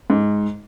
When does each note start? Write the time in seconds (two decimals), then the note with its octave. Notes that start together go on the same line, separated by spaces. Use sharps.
0.10 G#2